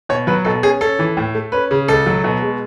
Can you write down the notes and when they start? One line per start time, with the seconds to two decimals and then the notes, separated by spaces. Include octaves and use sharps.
0.09 B2 C#5
0.27 F#3 B4
0.45 B2 A4
0.63 C#4 G#4
0.81 C#4 A4
0.99 E3
1.17 A2
1.35 A3
1.52 C#4 B4
1.71 C#3
1.88 C#2 A4
2.06 F#3
2.24 B2
2.42 G#3